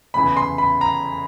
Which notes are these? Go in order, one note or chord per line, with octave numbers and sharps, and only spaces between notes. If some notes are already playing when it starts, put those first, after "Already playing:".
F1 E2 C#3 E3 B5
C6
B5
A#5